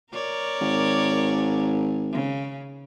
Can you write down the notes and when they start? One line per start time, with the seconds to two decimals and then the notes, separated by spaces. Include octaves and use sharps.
0.13 A#4 C#5 D5
0.61 G#1
2.13 C#3